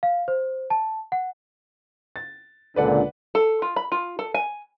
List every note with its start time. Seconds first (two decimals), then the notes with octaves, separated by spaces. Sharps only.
0.03 F5
0.28 C5
0.70 A5
1.12 F#5
2.16 A6
2.76 C#2 A#2 D3 B4 D5 F#5
3.35 A4
3.62 F4
3.76 B5
3.92 F4
4.19 A4
4.34 G#5